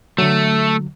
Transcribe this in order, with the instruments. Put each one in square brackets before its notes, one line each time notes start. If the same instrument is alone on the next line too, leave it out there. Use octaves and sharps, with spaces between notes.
[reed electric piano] D3 F#3 [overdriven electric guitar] A3